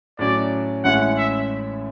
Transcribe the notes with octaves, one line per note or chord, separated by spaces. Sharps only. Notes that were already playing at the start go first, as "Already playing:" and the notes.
A2 F#3 C#4 F#4 D5
A1 A2 G#3 C#4 E4 F#5
E5